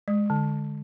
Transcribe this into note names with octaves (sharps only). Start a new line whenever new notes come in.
G#3
D3